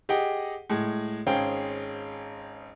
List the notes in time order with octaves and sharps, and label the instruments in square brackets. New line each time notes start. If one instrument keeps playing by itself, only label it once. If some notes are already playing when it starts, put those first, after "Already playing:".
[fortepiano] G4 G#4 D#5 F#5 G5
A2 G#3
G#1 C#4 G#4 C5 F5 G5